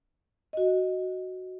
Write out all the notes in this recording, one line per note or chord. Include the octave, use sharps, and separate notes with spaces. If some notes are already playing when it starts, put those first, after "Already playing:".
F#4 D#5